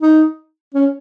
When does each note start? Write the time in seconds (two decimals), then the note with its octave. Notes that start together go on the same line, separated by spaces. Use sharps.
0.01 D#4
0.74 C#4